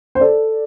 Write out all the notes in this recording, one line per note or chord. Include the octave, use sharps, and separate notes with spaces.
C5
A4 D5